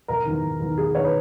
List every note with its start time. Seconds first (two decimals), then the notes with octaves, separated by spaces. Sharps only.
0.08 E1 A#4
0.25 E2 D#3
0.42 E1
0.60 E2 D#3
0.77 E1 G#4
0.94 E2 D#3 C#5
1.04 B4